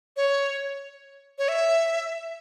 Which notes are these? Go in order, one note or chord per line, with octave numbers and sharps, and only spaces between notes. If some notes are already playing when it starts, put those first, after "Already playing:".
C#5
C#5
E5